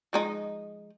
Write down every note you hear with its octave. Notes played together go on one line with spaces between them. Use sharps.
F3 G#3 D#4